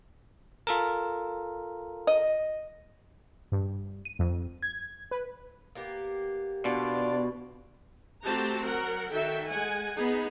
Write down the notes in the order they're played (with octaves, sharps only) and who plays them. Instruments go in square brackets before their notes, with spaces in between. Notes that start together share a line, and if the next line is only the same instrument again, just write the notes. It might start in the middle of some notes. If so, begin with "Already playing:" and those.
[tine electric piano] F4 A4 A#4
[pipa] D#5
[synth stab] G2
D#7
F2
G#6
B4
[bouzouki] A#3 B3 G4
[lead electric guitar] B2 [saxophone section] D4 F4 D5
[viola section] A3 C4 F#4 G4 A5 A#5
F#3 A#4 F#5
D#3 F#4 A4 E5 G5
G#3 F#5 G#5
B3 D#4 G#4